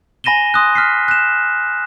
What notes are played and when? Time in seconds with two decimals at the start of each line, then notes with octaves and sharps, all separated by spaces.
0.24 G#5 B5 A#6 D#7 E7 G7
0.54 C6 D#6 F#6
0.75 F6 B6 C7
1.08 F#6 E7